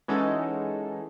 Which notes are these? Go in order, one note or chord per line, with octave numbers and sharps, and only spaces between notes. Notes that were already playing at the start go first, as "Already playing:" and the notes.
E3 G#3 C#4 D#4 F#4 A4